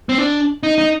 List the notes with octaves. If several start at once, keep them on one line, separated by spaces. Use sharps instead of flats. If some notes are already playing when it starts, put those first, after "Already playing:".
C4
D4
D#4
D#4